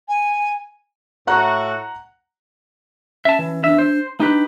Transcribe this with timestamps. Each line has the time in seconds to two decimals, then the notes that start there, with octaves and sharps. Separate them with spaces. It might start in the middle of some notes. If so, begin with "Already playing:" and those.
0.08 G#5
1.27 A2 F#4 F#5 A#5 F#6
3.25 C#4 E5 A5
3.39 E3
3.64 E2 D4 E5
3.79 C5
4.20 D4 D#4 G4 B4